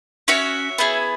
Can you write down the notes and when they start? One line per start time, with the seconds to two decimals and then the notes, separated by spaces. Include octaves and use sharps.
0.28 C#4 F#4 C#5 E5
0.78 B3 E4 G#4